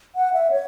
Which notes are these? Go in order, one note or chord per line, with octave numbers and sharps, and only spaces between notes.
F#5
E5
C#5